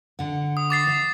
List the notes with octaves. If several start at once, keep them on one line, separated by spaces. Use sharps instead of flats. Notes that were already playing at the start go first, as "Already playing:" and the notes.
D3 F#5
D#6
D6 A6 C7
E5